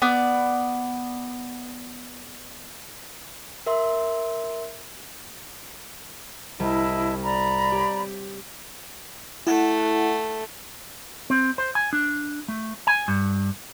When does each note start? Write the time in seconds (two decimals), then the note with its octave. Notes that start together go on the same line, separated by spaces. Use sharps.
0.02 B3 D5
3.66 A#4 E5 C6
6.60 C2 E4 D#5 A5
7.23 D5 A#5 B5
7.72 G4 C#5
9.47 A3 E4 F#5
11.30 C4
11.58 C5
11.75 G#5
11.93 D4
12.48 A3
12.87 G#5
13.08 G2